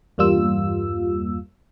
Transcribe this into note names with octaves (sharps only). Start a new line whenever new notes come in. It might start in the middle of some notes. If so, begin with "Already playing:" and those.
E2 G2 G3 A#3 F4 E6